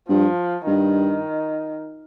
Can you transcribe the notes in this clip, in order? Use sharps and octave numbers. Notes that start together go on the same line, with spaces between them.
G2 F3
G2 D#3